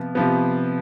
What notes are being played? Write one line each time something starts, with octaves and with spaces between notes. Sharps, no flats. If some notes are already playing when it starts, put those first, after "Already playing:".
Already playing: C3 F3 B3
C3 F3 B3